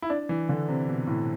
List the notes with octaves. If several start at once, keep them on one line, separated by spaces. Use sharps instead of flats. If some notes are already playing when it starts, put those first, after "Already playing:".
E4
D4
E3
D3
C3
B2
A2